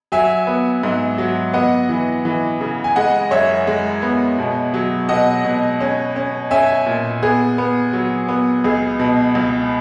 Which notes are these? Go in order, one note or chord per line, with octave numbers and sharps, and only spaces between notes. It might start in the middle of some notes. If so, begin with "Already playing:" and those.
F#3 E5 G#5
B3
G#2
F#3
B3 D#5 F#5
E3
E3
C#3
G#5
G#3 D#5 F#5
F#2 C#5 E5
G#3
B3
B2
F#3
B2 D#5 F#5
B2
C#4
C#4
C#4 E5 G#5
A#2
B3 G#4
B3
F#3
B3
C#2 G#4
B2
C#2